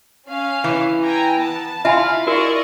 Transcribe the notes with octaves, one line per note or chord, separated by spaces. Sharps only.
C#4 F5 G#5
E3
G5 G#5 A#5
B3 A5
E4 F4 E5 F5 G#5 B5
E4 F#4 A#4 D5 D#5 C#6